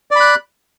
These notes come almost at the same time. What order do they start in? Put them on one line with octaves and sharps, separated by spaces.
D5 B5 F#6